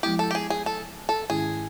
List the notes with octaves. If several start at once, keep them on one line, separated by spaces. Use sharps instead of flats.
F3 G#3 B3 E4 G4
A4
G4
G#4
G#4
A4
A4
G#2 D#3 G#3 C#4 E4 G#4